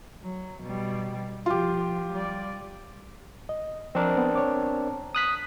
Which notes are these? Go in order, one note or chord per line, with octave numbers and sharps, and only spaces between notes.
F#3
B2 G3
F3 F4 G4
G3 D5
D#5
F3 C4 D4 A#4
B3
C#5 D6
D#6 F#6 B6